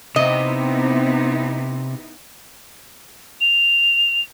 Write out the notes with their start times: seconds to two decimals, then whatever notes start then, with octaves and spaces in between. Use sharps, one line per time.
0.16 C3 B3 C4 D#4 E4 D#5
3.41 F7